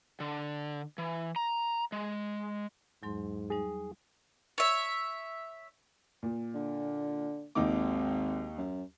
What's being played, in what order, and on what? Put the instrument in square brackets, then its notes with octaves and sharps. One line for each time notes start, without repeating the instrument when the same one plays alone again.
[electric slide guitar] D3
E3
A#5
G#3
[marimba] E2 F#3 C6 [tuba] G#2
[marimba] F#3 G3 D#4 [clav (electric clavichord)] G#4
[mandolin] C#5 E5
[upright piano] A#2
[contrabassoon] D3
[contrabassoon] G#1 [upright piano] D#2 D#4 D6
[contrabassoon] F#2